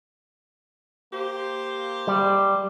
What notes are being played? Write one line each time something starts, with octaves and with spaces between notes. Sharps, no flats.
A#3 G4 C5
G3